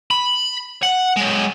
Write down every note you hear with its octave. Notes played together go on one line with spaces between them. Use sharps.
B5
F#5
F#3 G#3